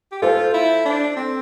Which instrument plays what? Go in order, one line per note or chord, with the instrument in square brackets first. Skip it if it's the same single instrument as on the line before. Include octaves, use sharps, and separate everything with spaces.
[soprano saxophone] G4
[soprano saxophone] F4 [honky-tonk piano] A4 C5
[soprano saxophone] E4
D4
C4